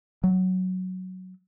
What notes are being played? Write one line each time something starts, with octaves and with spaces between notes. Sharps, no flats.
F#3